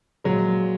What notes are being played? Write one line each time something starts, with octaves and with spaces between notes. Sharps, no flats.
A#2 F#3 G#3